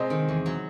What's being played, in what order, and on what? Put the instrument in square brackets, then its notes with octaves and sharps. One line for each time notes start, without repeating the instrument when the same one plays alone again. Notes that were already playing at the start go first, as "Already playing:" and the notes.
Already playing: [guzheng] C3 G#3 [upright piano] C5 D#5
[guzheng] D#3
E2
F#3